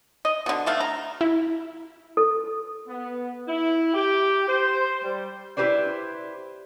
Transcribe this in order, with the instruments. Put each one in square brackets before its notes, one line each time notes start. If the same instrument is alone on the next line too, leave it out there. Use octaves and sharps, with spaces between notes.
[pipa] D#5
B2 D3
B2 A3 F5
A#5
[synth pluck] E4
[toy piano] A4
[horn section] B3
E4
G4
C5
G3
[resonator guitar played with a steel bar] E4 G4 B4 C5 D5